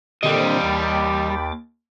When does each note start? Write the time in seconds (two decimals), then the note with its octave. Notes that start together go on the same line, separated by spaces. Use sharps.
0.23 A#2 D3 G3 C4 G4 D#5
0.60 D#2 G5 B5 D6 A6